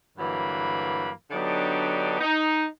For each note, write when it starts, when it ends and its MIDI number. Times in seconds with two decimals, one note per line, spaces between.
0.18 1.10 43
0.18 1.10 50
0.18 1.10 52
0.18 1.10 54
0.18 1.10 58
0.18 1.10 83
1.31 2.19 50
1.31 2.19 54
1.31 2.19 59
1.31 2.19 62
1.31 2.19 63
1.31 2.19 67
2.21 2.66 63